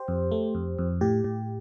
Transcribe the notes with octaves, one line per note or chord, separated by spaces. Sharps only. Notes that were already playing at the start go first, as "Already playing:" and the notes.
Already playing: G4 C5
F2
A3
F2
F2
A2 G4
A2